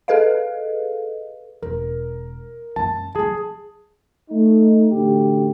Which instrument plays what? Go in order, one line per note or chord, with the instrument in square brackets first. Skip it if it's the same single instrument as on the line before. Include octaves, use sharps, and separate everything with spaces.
[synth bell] G#4 A4 B4 D#5 F5
[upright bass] E1 [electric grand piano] A#4
[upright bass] F#2 G#3 [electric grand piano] A5
[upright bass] C#3 F#3 [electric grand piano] G#4 A5
[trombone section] A3 D#4
A1 D2 G4